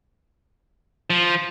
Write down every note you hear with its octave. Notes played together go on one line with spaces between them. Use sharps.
F3